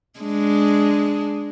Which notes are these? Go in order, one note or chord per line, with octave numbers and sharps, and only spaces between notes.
G#3 D4